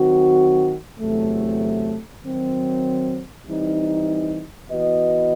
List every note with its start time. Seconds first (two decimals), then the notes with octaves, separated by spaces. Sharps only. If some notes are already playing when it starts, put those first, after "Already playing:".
Already playing: D#3 F#3 C4 F#4
1.00 E2 C3 F#3 A3
2.23 D#3 F#3 C4
3.46 E3 G3 C4 D#4
4.69 E3 B3 F#4 B4 D#5